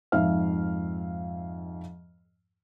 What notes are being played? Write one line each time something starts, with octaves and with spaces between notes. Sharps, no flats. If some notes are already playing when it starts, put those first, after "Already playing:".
F2 G#2 E5 F5 F6